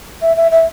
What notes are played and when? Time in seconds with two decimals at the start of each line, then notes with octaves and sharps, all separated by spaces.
0.22 E5
0.37 E5
0.51 E5